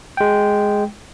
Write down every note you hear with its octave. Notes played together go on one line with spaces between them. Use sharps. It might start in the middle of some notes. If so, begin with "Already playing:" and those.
G#3 G5